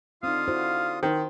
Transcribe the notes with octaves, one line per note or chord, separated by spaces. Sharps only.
D3 C4 D#4 F4 F5 D#6
E4 F#4 C5
D#3 D#4 C5